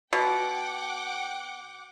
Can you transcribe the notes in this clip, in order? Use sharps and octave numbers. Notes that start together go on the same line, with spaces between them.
B2 F#5 G5 D6